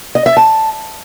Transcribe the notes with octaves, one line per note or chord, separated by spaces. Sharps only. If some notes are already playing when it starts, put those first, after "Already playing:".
D#5
E5
A5